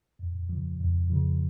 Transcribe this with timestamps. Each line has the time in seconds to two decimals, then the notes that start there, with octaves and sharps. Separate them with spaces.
0.19 F2
0.49 C#3 F3
0.81 F2
1.10 C#3 F3